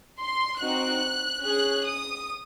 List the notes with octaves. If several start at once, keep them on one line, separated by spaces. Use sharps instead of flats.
C6
C4 D#4 F#4 F#6
C#4 G#4 F#6
D#6